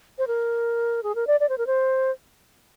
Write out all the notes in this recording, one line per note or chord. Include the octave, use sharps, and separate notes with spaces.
C5
A#4
G#4
A#4
D5
D5
C5
A#4
C5